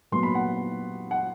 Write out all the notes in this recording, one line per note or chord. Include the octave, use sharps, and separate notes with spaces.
A#2 F#3 B3 C6
B5
F#5
F#5